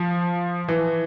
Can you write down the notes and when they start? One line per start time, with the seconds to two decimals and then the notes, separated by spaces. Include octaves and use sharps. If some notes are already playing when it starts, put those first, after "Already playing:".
Already playing: F3
0.68 E3